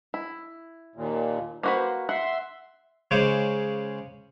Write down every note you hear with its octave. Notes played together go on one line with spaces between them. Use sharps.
E4
D#2 A#2
A#3 F#4 B4 C5
E5 F#5 C6
C#3 G#3 C5 C#5 D6